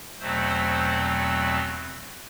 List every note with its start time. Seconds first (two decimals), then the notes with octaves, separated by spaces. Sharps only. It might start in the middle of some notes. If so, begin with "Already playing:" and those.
0.19 E2 B2 F#3 A3 C4 C5